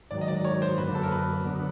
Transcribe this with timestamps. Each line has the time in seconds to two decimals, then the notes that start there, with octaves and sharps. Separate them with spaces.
0.11 G#2 D#3 F#3 D5
0.21 D#5
0.28 D5
0.45 C#5
0.62 C5
0.77 F#2 D3 F#3 A#3 B4
0.95 A4
1.03 A#4
1.12 B4
1.45 D3 F#3 B3 D4